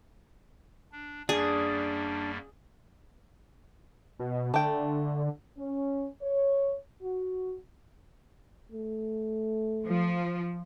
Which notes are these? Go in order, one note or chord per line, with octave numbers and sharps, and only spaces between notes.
D4
F#2 G3 A#3 D4 G#4
B2
D3 A3 G5
C#4
C#5
F#4
A3
F3